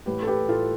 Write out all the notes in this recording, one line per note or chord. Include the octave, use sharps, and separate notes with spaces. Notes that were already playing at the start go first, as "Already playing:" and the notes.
A1 G4 B4
A4
G4 B4
A2 F4 A4